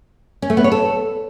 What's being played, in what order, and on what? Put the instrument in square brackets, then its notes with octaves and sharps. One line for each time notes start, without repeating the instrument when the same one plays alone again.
[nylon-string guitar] C#4
A3
B3
C#5
A4